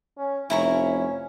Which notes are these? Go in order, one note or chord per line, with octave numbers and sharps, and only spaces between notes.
C#4
F1 C#4 E4 A#5 C#6